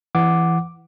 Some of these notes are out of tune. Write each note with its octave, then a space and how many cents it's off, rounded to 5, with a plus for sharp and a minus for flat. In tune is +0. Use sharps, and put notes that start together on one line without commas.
E3 +20 F#5 +0 D6 +0